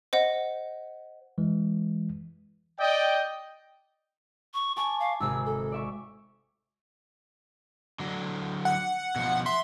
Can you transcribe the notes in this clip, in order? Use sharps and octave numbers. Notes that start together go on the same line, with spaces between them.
C5 D#5 F#5
E3 G#3
D5 D#5 G5
C#6
G#5 A5 C#6 D6
F5
G#1 C3 G#4 E6
A4
D5 E5 C#6
D3 F#3
F#5
B2 F3
E5 C6